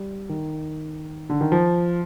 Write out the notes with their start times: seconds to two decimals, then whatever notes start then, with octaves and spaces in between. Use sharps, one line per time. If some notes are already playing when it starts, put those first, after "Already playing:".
Already playing: G3
0.29 D#3
1.30 D3
1.41 D#3
1.52 F3